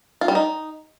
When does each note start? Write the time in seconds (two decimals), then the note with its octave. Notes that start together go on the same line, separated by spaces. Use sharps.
0.21 F4
0.28 G3
0.35 D#4